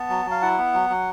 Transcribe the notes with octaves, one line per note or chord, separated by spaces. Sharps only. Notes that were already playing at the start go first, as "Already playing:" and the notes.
Already playing: B3 A5
F#3
F#3
F5
E4 F#5
B3
F#3
F#3